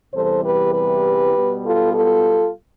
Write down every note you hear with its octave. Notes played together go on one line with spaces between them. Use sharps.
E2 C3 E3 G3 A4 C5
G4 B4
G4 B4
B2 G3 B3
F4 A4
F4 A4